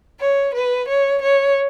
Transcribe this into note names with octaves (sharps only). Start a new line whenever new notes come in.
C#5
B4
C#5
C#5